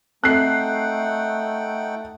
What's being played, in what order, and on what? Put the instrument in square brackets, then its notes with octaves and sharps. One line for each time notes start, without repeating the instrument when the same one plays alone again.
[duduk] A3 [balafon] C4 A4 [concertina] D#4 F#5 G5 [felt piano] F#6 C7